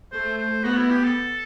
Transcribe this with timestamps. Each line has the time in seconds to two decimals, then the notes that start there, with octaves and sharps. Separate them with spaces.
0.12 A3 C5
0.38 C5
0.64 B3 F#4
0.77 E4
0.90 G4
1.04 A4